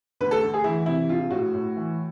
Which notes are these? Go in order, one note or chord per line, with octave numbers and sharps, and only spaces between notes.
D2 B4
A4
D2
G#4
E3 E4
C3 E4
A#1 F4
A2 F#4
A2
E3